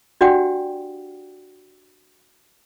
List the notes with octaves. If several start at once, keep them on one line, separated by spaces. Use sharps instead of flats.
D4 F#4 G4 D5 F#5 G5